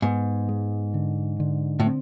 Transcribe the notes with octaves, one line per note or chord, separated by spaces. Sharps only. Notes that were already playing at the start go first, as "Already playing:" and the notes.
G#2 B3
G#3
D3
D3
A2
C4